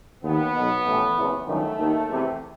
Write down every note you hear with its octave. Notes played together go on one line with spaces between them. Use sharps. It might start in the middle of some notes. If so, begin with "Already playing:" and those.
D#2 D#3 B3
B1 B2
A1 A2 E3
F#1 E2 C3
G1 F#2 D#3 A3
D#2 D#3
E2 C3 E3